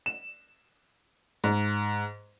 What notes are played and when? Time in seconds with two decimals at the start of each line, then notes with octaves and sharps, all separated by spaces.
0.06 E7
1.44 G#2